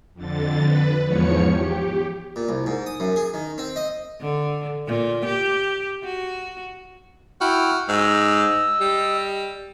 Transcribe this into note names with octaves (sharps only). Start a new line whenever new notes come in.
F2 D3 A6
B4
E2 G#2 F3 C#5 C#7
G4
A#2
C2
G#2
D#6
F#2
G#4
D#3
C4
D#5
D3
A#2
G4
F#4
E4 F#4 G5 F6
G#2 D#5 E6
G3